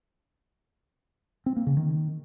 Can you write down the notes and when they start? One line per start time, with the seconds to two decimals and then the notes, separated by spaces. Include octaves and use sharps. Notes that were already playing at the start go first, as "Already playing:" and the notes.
1.46 C4
1.56 A#3
1.67 C#3
1.77 D#3